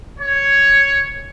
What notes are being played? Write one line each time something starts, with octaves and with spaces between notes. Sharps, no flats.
C#5